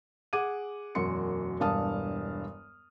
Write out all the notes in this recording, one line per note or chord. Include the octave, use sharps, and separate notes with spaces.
G#4 F#5 D6 G#6 D#7
E1 F#2 F#4 C6 C#7
E1 G2 F5 A5 D#6 F6